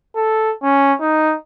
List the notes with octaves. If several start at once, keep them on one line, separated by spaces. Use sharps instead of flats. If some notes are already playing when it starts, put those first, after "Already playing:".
A4
C#4
D#4